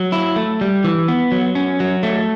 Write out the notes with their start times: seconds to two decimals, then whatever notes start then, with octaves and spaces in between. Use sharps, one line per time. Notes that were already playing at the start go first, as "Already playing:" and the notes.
Already playing: F#3
0.12 E4
0.36 A3
0.61 G3
0.84 E3
1.08 B3
1.32 F#3
1.55 C#4
1.80 F#3
2.03 A3